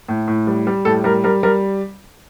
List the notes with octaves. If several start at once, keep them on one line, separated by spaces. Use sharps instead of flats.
A2
A2
G3
G3
A2 A4
G3 A#4
G3 A#4
G3 A#4